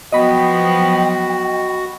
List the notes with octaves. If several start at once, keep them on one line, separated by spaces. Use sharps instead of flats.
F3 F#3 B3 F#4 D#5 G5 B5